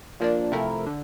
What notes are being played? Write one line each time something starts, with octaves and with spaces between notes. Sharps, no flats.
A#2 F3 A#3 D4
C3 F3 A3 E4 A#4
D3